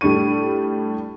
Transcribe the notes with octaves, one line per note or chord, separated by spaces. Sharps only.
A2 G3 D4 C#6 D#7